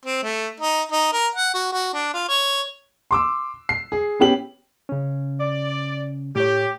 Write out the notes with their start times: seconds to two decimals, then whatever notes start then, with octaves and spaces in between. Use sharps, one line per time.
0.05 C4
0.23 A3
0.60 D#4
0.92 D#4
1.13 A#4
1.35 F#5
1.54 F#4
1.72 F#4
1.93 D4
2.14 F4
2.28 C#5
3.11 C6 D6 E6
3.69 C7
3.92 G#4
4.20 B3 C#4 G4 F#7
4.89 C#3 C#4
5.40 D5
6.36 A2 G4 C#5